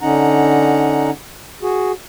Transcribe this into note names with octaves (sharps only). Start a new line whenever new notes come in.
D3 C#4 D#4 F#5 A#5
F#4 G#4